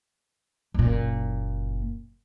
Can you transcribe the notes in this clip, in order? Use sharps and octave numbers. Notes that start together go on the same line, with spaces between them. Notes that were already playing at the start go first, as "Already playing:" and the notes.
F#1 A#2